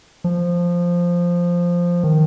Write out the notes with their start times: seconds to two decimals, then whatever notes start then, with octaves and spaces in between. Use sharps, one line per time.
0.24 F3
2.04 D#3